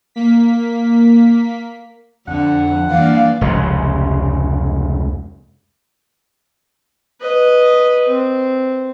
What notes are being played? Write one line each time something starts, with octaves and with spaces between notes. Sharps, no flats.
A#3 B6
F2 D3 F#5
G2 E3 A#3 D5 F5
F1 C#2 C#3 G#3
B4 D#5
C4